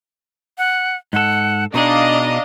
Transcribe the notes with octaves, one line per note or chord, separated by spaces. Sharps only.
F#5
G#2 A4 F#5
B2 D4 D#4 G#4 D#5 F5 A#5